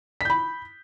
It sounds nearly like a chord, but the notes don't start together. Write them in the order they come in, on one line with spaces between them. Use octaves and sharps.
B6 G6 B5